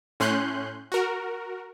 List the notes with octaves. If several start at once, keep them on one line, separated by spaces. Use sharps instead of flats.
A2 C#4 C6 F#6 G6
F#4 A#4